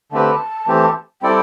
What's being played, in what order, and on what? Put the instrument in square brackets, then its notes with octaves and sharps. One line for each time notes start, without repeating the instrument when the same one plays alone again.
[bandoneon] D3 A3 C4 G4 B4 [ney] A5
[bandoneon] E3 A3 C4 G4
[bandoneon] G3 C4 E4 A4 D5 [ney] G5